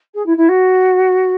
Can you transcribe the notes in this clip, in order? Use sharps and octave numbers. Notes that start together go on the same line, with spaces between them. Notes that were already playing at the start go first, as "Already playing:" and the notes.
G#4
E4
E4
F#4